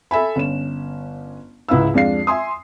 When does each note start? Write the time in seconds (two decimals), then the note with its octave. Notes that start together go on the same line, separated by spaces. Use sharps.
0.11 A4 E5 G#5 B5
0.36 G1 C#4 E7
1.69 C#2 G#2 E4 B4 F5 E6
1.94 F2 G#3 D4 F5 C7
2.27 E5 G#5 C6 D#6